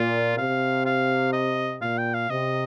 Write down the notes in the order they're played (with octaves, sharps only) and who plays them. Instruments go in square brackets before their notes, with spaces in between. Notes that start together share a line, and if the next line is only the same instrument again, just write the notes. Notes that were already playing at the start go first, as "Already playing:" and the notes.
Already playing: [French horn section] A#2 [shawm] F4
[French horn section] C3 [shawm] F5
[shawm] F5
D#5
[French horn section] A#2 [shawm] F5
[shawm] G5
F5
[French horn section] C3 [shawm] D#5